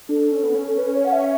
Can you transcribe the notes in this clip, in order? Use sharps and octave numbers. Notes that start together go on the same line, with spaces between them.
D4 A4
C#4
B3
C#4
A4
B4
C#5
F#5
E5